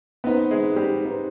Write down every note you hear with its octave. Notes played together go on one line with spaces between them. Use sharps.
B3 C4 D#4 B4
G#3
G3
C4 D#4 B4